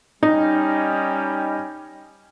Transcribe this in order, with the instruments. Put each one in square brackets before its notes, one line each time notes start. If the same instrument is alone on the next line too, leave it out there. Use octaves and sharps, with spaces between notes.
[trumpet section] G3 C#4 G5 [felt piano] D#4